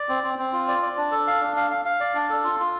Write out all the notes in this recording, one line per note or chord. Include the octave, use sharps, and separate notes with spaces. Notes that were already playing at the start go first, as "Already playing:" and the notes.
Already playing: D5
C4
C4
C4
F4
D5
D5
D4
A4
F5
D4
F5
F5
F5
D5
D4
A4
F4
F4